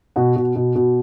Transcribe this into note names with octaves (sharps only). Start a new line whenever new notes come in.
B2 F#4
B2
B2
B2